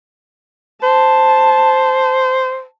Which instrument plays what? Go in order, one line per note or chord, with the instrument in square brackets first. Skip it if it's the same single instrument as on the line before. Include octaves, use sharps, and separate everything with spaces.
[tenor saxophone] C5 [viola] A5